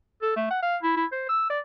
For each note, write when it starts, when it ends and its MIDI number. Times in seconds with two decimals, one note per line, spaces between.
0.22 0.35 69
0.36 0.46 57
0.51 0.60 78
0.63 0.77 77
0.83 0.93 64
0.96 1.06 64
1.12 1.27 72
1.29 1.47 88
1.50 1.60 74